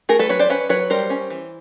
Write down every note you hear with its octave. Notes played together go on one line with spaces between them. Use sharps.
A3 G#4 A#4
A4 B4
F#3 B4 C#5
C5 D5
C#4 B4 C#5
F#3 B4 C#5
G3 A#4 C5
C#4
E3